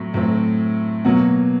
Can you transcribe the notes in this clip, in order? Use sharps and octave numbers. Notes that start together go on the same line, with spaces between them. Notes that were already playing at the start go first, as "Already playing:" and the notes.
Already playing: A2 F#3 A3 C4
A2 F#3 A3 C4
B2 F#3 A#3 F#5